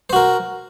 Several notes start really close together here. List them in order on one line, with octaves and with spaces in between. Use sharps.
C5 F#4 A#4